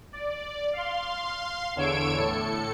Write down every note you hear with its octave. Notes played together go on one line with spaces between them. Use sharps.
D5
F5 C6
E2 D3 C#5 E6 G#6 D7
A2 A4 C#7